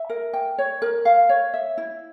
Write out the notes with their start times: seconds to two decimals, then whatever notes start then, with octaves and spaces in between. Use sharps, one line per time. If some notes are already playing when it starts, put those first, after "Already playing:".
Already playing: E5
0.09 A#4
0.33 G5
0.58 C#5
0.82 A#4
1.05 F5
1.29 C#5
1.54 E5
1.77 E4